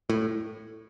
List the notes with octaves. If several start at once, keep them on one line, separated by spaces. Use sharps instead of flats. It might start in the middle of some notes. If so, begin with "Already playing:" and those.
A2